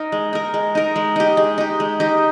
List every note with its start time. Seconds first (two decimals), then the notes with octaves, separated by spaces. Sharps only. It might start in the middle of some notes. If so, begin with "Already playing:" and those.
Already playing: D#4 A#4
0.12 G#3
0.33 D#4 A#4
0.54 G#3
0.75 D#4 A#4
0.96 G#3
1.16 D#4 G4
1.37 G#3
1.58 D#4 G4
1.80 G#3
2.00 D#4 G4